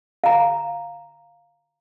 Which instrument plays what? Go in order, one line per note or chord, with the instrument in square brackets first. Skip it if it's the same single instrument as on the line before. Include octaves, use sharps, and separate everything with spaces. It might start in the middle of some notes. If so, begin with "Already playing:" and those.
[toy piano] F5 A#5